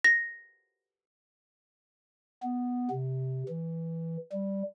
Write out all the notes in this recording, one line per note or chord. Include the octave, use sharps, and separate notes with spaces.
A#6
B3
C3
E3
G3